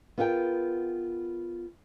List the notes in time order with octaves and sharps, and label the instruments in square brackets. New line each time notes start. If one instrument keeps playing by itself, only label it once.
[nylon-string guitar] B3 F4 G#4 A#4 F#5 G5